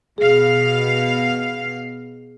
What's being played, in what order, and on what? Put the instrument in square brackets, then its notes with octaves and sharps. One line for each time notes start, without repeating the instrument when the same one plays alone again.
[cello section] B2 F5 [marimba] G#4